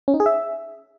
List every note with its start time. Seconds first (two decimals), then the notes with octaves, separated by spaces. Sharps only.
0.08 C#4
0.14 D#4
0.20 G#4
0.26 E5